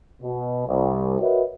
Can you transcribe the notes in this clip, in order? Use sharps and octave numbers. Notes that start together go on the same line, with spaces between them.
B2
C2
F#4 A#4 B4 C#5 D#5 E5